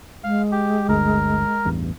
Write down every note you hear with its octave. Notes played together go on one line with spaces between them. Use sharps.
G#3 F5
G4
G1 D2 A#4
A1 E2 G2